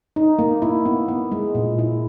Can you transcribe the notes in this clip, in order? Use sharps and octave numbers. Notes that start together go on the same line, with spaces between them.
D#4
A#3
E4
B3
B3
G#3
A#2
E4